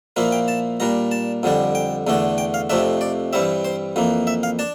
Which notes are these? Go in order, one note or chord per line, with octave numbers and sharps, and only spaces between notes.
A#2 F3 A#3 E4
G5
A5
A#2 G3 D4 A#5
A5
F2 D3 G3 D4
G5
E2 D3 A3 D4
G5
F5
F2 C3 F3 A3 D4 E5
D5
G2 E3 G3 C4 E5
C5
F2 E3 A#3
E5
F5
D4 A5